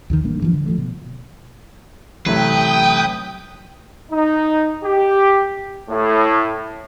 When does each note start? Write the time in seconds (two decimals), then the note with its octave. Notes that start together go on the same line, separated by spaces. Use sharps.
0.10 D#2 D3 D#3
0.23 A1 G3 A#3 D4
0.40 G2 E3 F3
0.54 D3
0.66 F3 F#3 A3
0.78 B2
2.26 A1 C3 F#3 A3 B4 G5 D#6 G6
4.11 D#4
4.84 G4
5.89 A2